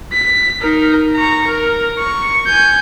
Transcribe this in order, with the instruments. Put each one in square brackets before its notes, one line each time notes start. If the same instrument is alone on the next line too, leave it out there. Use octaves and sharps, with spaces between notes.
[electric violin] B6
D#4 A#4
A#5 C#6
A#4
C#6
G#5 G6